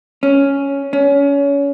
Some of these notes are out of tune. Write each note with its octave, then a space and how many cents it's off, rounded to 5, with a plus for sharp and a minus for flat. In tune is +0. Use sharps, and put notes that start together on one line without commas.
C#4 +5
C#4 +25